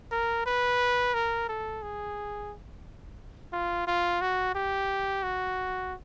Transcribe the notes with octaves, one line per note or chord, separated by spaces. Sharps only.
A#4
B4
A#4
A4
G#4
F4
F4
F#4
G4
F#4